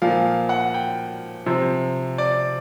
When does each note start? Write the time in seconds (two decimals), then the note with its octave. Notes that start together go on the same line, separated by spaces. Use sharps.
0.02 A#2 F3 F5
0.49 F#5
0.74 G5
1.46 C3 F3
2.18 D5